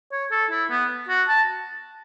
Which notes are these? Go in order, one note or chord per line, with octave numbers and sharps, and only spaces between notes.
C#5
A4
E4
B3
F#4
A5